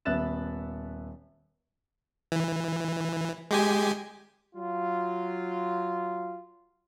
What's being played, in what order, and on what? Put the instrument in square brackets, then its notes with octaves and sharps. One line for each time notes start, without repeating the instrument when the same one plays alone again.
[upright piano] D#1 B3 E5 F#6 A6 E7
[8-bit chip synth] E3
G#3 G4 G#5
[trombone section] F#3 F4